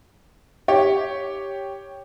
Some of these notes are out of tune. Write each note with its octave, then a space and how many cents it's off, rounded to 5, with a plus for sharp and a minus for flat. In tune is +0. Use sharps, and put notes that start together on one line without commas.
G4 +0 C#5 +0